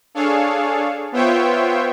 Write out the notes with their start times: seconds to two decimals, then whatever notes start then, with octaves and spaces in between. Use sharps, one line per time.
0.15 D4 G#4 A4 C#5 F5
1.12 B3 F4 C5 C#5 E5 G5